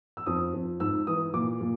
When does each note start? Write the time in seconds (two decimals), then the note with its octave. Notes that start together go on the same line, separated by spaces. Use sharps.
0.17 E6
0.26 F2 D#6
0.54 F2
0.80 G#2 E6
1.07 E3 D#6
1.33 A#2 D6
1.61 A#2